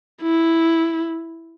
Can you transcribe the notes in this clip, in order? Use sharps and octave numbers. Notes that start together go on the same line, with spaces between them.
E4